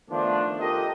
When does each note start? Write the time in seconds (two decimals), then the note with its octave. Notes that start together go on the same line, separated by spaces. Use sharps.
0.10 D#3 F3 A3 B3 D4
0.60 F4 G4 A4 A#4 D#5